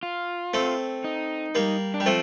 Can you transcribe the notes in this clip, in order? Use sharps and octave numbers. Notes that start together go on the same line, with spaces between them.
F4
A3 C4
D#4
G3 A#3
D4
G3
F3 A3 C4